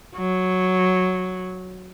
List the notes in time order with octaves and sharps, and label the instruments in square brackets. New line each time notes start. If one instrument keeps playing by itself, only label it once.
[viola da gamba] F#3